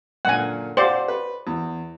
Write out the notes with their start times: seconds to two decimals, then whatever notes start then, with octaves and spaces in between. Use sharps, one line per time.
0.25 F#2 A#2 D3 F#5 G#5
0.77 G4 C5 D5 F5 F#5
1.08 B4
1.47 E2